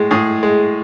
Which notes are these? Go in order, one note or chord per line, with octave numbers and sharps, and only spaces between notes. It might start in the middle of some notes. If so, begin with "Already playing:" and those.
Already playing: A2 G#3
A2 G#4
G#3